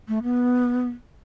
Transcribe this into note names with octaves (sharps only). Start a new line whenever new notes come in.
A3
B3